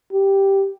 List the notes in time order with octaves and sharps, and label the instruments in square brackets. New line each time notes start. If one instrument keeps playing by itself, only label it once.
[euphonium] G4